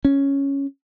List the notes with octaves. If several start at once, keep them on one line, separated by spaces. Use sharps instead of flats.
C#4